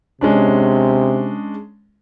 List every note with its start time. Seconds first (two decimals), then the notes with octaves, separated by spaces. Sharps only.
0.21 C3 G#3 C#4 D4